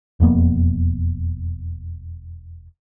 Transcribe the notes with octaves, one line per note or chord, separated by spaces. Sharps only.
E1 F2 A#3 B3